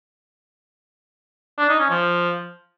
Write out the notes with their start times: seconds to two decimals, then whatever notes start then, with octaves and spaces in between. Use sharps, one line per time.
1.58 D4
1.69 D#4
1.79 C#4
1.90 F3